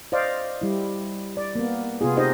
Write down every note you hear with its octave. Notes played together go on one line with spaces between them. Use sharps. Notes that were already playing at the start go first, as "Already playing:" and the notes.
C5 D5 D#5 F5
G3 E4
D5
A#3 B3
C3 B3 F4 G#4
D#4 G4 C5 D#5